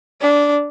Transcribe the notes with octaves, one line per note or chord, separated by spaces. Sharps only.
D4